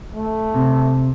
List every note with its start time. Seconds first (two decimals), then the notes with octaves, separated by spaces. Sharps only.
0.14 A3
0.54 C3